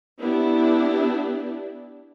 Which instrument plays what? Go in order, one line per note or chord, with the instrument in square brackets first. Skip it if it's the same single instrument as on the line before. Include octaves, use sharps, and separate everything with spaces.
[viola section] B3 D4 E4 G4